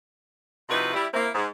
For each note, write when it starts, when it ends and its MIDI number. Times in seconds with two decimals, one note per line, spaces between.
0.69 0.92 48
0.69 0.92 53
0.69 0.92 63
0.69 0.92 64
0.69 0.92 66
0.69 0.92 71
0.94 1.05 55
0.94 1.05 64
1.13 1.27 58
1.13 1.27 60
1.13 1.27 64
1.35 1.46 44